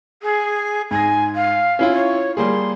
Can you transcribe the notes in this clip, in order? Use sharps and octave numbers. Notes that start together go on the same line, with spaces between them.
G#4
G#2 G#5 A#6
F5
C#4 E4 F4
C#5
G3 A#3 G#4 C6